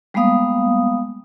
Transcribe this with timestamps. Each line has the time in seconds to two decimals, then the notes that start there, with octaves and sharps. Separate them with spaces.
0.14 G3 G#3 A#3 B3 F5 D#6